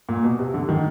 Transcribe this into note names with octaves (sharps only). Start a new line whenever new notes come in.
A#2
B2
C3
D3
D#3